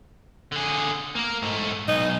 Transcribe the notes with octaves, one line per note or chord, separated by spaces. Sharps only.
D3 G#4
A#3 A#4
G#2 A3
B1 D#4